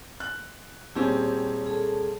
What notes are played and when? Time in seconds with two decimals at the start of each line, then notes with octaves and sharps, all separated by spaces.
0.20 F#6
0.95 D#1 C4 C#4 E4 G4 G#4
1.66 G#4 A4 A5